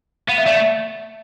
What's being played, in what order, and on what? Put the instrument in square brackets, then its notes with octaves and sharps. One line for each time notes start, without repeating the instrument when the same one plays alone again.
[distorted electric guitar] B3 [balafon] F5
[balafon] E5
[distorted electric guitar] A3 [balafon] D5
[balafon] E5